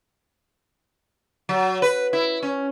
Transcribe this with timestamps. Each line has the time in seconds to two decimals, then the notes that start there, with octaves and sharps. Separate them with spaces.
1.49 F#3
1.82 B4
2.13 E4
2.43 C#4